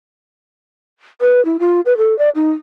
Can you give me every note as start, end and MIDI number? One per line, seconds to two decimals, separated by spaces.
1.21 1.43 71
1.45 1.57 64
1.60 1.81 65
1.86 1.97 71
1.98 2.17 69
2.19 2.30 74
2.35 2.51 63